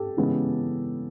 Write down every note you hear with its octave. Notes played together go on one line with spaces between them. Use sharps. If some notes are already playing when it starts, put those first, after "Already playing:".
Already playing: G4 A4
C#3 E3 G#3 B3